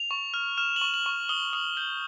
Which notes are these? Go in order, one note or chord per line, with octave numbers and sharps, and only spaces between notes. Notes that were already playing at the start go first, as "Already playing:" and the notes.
Already playing: F7
C#6
F6
F6 E7
F#7
C#6
F#7
C#6
D#6 G7
D#6 F#7
G6 F#7